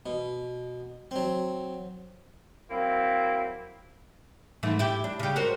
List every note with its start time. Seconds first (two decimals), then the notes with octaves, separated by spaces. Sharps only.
0.06 B2
1.11 F#3 C4
2.71 F#3 A#3 C4 E4
4.63 G#2 E3 A3
4.79 E4 G4
5.04 D4
5.20 C#3 G4
5.36 F#4 A#4 C5